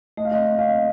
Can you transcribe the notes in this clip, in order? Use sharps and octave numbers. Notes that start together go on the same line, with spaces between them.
A3 D#5
F5
D#5
C4
C4 F5